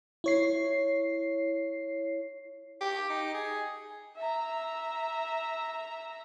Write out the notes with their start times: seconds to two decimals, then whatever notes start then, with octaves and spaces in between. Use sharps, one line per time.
0.24 E4 C#5 C7
2.81 G4
3.10 D#4
3.35 G#4
4.17 E5 A#5